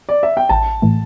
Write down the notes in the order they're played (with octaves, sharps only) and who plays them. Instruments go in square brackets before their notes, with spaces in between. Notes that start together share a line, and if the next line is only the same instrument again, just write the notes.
[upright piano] D5
E5
G5
[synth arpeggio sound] A1 [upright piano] A5
[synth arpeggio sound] A2 E3 A3